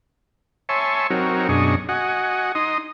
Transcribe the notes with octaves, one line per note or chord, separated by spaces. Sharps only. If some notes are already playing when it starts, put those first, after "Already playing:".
C#5 E5 G#5 A5 C6 C#6
F#3 C4 D#4 F#4 A#4 C#5
F#2 B2 D4 G#4 D#5 C#6
F#4 D#5 F#5 G#5
D#4 D#5 C6 D#6